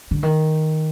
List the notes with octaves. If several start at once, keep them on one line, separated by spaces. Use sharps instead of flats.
D3
D#3